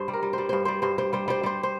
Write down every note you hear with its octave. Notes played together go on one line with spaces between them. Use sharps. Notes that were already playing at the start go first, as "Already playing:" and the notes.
Already playing: G2 C5
G3
A#4
G3
G3 C5
G2 C5
G3 C5
G2 C5
G3 C5
G3 C5
G3 C5
G3 C5
C5